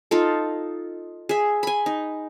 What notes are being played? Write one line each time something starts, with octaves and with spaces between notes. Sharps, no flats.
D#4 F4 A4
G#4 E5
G#5 B5
D#4